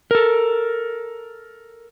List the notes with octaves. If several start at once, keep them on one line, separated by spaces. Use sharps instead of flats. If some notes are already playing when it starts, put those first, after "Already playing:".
A4 A#4